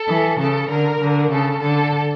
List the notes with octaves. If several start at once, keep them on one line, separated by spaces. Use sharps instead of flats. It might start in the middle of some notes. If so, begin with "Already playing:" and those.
Already playing: A4
E3
C#3 A4
D3 A#4
D3
C#3 A4
D3 A4